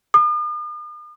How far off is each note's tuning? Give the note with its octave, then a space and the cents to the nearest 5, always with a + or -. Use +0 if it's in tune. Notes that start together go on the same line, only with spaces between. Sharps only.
D#6 -45